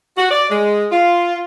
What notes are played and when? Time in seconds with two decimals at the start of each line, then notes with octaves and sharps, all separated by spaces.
0.18 F#4
0.31 D5
0.50 G#3
0.92 F4